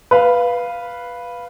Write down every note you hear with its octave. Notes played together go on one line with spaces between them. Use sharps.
B4 F5